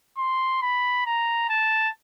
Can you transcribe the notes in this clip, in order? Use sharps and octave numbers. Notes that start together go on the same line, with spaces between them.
C6
B5
A#5
A5